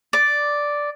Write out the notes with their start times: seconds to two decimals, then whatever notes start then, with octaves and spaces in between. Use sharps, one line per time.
0.13 D5